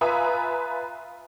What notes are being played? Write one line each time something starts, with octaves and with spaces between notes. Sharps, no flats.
F4 B4 E5 G#5 A#5 D#6